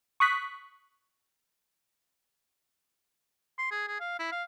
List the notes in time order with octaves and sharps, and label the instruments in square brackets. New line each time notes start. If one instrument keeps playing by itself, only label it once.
[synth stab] C#6 D#6 F#6 B6
[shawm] C6
G#4
G#4
F5
E4
F5